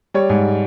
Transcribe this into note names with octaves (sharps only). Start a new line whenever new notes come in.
G3 C#5
G#2